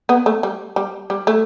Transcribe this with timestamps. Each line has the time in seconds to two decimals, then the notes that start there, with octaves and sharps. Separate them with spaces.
0.09 B3
0.26 A3
0.43 G3
0.76 G3
1.10 G3
1.27 A3